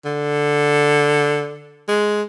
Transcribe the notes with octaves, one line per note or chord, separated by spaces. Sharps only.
D3
G#3